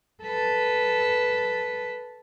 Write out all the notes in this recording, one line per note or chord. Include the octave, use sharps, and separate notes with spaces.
A4 B4